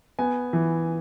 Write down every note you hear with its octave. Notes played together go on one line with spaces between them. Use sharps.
B3 G#5
E3